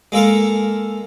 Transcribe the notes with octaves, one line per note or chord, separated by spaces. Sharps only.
G#3 A#3 A4 A#4